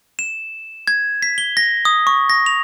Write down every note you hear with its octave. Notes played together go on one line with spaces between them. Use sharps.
E7
G#6
B6
G7
A#6
D#6
C#6
A#6
F7